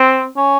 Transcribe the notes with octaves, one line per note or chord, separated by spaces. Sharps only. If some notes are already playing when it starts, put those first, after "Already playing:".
Already playing: C4
C#4